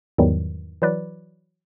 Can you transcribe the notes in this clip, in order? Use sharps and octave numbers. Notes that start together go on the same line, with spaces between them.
E2 G#2 D#3 E3 F#3 G3
E3 F#3 B4 D5